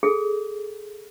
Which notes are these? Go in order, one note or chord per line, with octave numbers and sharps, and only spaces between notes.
G#4 A4